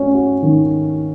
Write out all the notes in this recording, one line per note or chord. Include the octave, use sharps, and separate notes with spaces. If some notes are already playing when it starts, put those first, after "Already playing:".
Already playing: A3 C#4 F#4
F#4
D#3